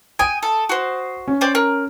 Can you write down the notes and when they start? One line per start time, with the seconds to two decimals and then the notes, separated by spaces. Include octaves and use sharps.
0.19 G5 G#5 D#6 D7
0.43 A4
0.69 F#4 C5
1.28 C#4
1.41 C5 D5 G5
1.55 A#4